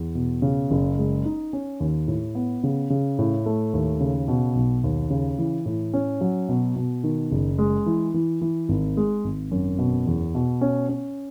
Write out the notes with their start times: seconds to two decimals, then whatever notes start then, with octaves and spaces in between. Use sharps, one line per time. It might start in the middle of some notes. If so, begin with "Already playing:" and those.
Already playing: E2
0.15 B2
0.42 C#3
0.71 F#1
0.98 G#3
1.25 D#4
1.53 C#4
1.80 D#2
2.08 A2
2.35 B3
2.64 C#3
2.90 C#3
3.19 A2
3.46 A3
3.73 D#2
4.00 C#3
4.28 B2
4.55 B1
4.84 D#2
5.10 C#3
5.38 E3
5.66 A2
5.94 C#4
6.21 F#3
6.49 B2
6.76 B2
7.04 D#3
7.31 F#1
7.58 G#3
7.86 E3
8.14 E3
8.41 E3
8.69 G#1
8.97 G#3
9.24 G#1
9.51 F#2
9.78 B2
10.07 E2
10.35 B2
10.61 C#4
10.89 C#4